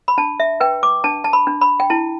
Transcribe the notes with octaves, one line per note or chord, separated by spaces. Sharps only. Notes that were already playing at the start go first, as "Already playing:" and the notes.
B5
D4 A5
E5
B4 G5
D6
D4 A5
A5
B5
D4
B5
G5
E4 A5